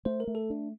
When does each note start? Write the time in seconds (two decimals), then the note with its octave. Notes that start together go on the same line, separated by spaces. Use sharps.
0.05 A3 C5
0.20 A#4
0.27 A3
0.35 A4
0.50 D4